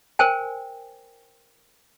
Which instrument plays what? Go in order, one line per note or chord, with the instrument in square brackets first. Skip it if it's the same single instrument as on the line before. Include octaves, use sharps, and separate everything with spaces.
[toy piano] A#4 C5 G5 G#5